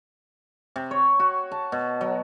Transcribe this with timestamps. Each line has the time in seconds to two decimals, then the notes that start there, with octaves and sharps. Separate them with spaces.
0.76 C3
0.91 C#5
1.20 F#4
1.52 A5
1.72 B2
2.01 F#3